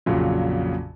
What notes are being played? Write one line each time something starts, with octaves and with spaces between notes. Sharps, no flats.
A#1 F2 A#2 C#3 F#3